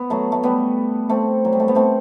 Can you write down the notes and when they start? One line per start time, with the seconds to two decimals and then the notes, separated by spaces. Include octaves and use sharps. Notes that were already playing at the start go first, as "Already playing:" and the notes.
Already playing: B3
0.10 F#3 A3
0.32 A3
0.43 G3 B3
1.09 A3 C4
1.45 F#3
1.53 G3
1.60 A3
1.68 B3
1.75 A3 C4